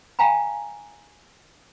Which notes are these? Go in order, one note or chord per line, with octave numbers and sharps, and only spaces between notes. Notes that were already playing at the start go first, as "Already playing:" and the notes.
F5 G5 G#5 A#5 B5